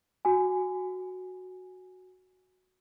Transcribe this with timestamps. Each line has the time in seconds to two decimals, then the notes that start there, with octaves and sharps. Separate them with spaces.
0.25 F#4 G#5